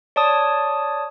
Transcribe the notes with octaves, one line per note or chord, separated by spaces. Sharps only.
C#5 D5 A5 D#6